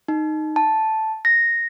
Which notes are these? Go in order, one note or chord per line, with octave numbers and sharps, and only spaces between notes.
D#4
A5
A#6